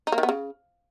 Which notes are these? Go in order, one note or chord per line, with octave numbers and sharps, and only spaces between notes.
D#4
A#3
D#3
B3
C#3